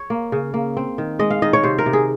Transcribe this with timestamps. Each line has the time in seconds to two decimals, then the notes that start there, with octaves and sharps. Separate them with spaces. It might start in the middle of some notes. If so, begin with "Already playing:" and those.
Already playing: C#5
0.10 A#3
0.32 C#3
0.54 A#3
0.77 C4
0.98 D#3
1.19 G#3 D#5
1.30 F5
1.42 D#3 D#5
1.53 C#5
1.63 C3 C5
1.78 A#4
1.86 C3
1.93 G#4